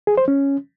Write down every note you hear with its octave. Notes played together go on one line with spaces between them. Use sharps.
G#4
C5
C#4